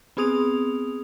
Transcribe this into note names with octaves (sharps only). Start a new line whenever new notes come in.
B3 C4 G#4 D#6 F7